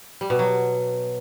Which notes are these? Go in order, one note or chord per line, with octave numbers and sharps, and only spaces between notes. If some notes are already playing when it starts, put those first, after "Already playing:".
G3
B2
F#3